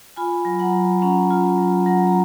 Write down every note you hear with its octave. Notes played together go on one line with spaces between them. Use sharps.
F4 G#5 B5
F#3
F#5 A#5
F#3
C#4 F#5 A#5
F4
F#3
F#3 F#5 A#5
A#5